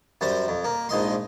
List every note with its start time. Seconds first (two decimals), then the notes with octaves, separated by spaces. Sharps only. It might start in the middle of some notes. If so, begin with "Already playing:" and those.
0.21 F#2 G3 C5
0.48 F2
0.64 A#3
0.89 A#1 G#2 D#5 C6